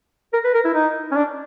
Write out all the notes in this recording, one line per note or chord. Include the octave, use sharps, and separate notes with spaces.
A#4
B4
A#4
E4
D#4
C#4
D4